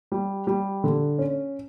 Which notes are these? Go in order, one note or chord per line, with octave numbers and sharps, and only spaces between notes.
G3
G3
D3
C#4